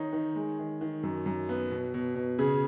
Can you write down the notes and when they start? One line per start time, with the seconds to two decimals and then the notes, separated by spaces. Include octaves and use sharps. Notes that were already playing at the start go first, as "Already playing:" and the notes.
Already playing: D#3 D#4 C#5
0.13 D#3
0.35 G#3
0.59 D#3
0.81 D#3
1.03 F#2
1.26 F#2
1.49 B3
1.71 B2
1.94 B2
2.15 B2
2.39 C#3 G#4